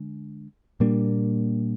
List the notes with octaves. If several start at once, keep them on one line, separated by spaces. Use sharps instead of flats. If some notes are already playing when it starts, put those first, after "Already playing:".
Already playing: D3 G#3
A#2 G3 A#3 D4